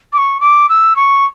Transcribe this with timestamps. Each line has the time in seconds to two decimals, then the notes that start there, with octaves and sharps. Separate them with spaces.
0.12 D6
0.17 C#6
0.40 D6
0.69 E6
0.96 C#6